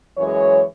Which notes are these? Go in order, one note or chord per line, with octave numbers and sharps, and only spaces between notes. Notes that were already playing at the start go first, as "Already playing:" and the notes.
F#2 E3 G#3 C#5